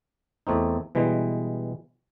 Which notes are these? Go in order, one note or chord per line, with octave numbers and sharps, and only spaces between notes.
E2 A3 C4 D#4
B2 E3 G3 G#3